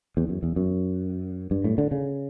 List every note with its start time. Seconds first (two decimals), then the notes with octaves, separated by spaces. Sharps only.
0.17 E2
0.29 F#2
0.43 E2
0.56 F#2
1.51 G2
1.64 A2
1.78 D3
1.91 C#3